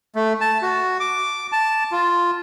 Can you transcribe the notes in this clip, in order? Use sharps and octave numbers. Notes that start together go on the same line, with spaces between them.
A3
A5
F#4
D6
A5
F4